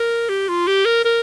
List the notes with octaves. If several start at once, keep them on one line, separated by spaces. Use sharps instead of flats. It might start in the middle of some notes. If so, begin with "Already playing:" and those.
Already playing: A#4
G4
F4
G4
A#4
A#4